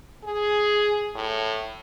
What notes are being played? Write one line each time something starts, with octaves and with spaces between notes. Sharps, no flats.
G#4
A2